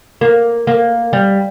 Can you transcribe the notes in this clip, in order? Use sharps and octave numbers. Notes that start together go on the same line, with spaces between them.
A#3
A#3
G3